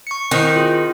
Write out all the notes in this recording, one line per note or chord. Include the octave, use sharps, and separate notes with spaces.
C#6 C#7
D#3 C4 E4 C5
F4 G#4